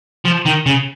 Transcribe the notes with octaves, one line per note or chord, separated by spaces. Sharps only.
F3
D#3
C#3